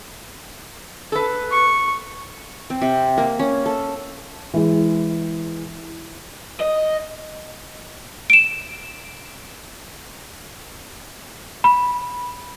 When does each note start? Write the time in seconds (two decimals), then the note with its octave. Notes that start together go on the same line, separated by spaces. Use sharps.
1.12 A4 B4
1.51 C#6
2.70 C4
2.82 C3
3.18 A#3
3.39 C#4
3.66 A4
4.54 E3 G#3
6.61 D#5
8.30 D7 E7
11.64 B5